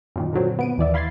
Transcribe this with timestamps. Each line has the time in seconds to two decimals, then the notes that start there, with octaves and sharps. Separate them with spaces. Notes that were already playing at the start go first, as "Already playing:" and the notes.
0.16 F#2 A#2 D#3
0.33 A#2 D3 F#3 C4
0.59 B3 D7 D#7
0.78 D#2 E3 D5 E5
0.94 F5 B5 C6 G#6 A6 C7